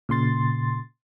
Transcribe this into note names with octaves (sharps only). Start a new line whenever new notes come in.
A#2 C#3 C6 A6